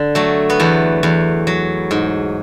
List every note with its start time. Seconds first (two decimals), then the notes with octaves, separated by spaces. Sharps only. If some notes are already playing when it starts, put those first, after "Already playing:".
Already playing: D3
0.15 F#3 A3
0.50 B3
0.60 E2 A3
1.03 E2
1.47 F#3
1.91 G#2